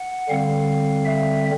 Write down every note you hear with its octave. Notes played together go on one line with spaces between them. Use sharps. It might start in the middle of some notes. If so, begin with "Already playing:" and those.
Already playing: F#5
D3 G3 C4 F5
E5